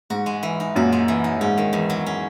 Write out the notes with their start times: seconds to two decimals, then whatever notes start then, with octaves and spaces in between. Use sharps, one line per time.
0.10 G#2 F#4
0.26 G#3
0.43 E3
0.60 D#4
0.75 F#2 A#2 F#4
0.92 G#3
1.08 E3
1.24 D#4
1.40 G#2 C#4
1.58 D#3
1.73 E2
1.90 F#3
2.06 C#4